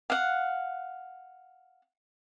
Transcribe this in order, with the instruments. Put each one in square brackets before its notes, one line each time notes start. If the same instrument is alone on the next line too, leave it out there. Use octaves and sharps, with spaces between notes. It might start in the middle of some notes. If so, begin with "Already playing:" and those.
[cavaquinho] F5 F#5